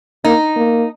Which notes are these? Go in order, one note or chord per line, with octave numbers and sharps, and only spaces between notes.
A#3 D#4
A#3